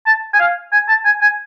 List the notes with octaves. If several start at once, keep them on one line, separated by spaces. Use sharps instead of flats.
A5
G#5
F5
G#5
A5
G#5
G#5